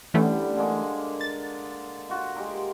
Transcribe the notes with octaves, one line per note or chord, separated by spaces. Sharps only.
D3 E3 G3 A3 B3 C#4
D3 G#3 A#3
A6
F4 F#4
G#3 G4 A#4